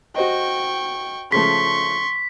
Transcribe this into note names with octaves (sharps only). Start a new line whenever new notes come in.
F#4 C5 D#5 G5 C#6
C#3 F3 A3 C6 C#6 B6